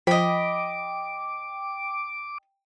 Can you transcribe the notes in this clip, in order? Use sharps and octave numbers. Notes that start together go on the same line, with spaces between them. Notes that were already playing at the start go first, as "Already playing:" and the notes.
F3 D#5 G5 B5 D6